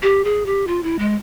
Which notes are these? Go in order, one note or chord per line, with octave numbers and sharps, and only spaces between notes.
G4
G#4
G4
F4
E4
G#3